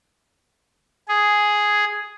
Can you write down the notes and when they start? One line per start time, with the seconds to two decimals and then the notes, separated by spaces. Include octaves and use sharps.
1.08 G#4